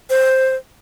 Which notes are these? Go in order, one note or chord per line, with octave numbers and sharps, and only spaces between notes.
C5